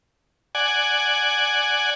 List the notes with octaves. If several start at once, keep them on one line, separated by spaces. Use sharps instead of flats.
D5 F#5 G#5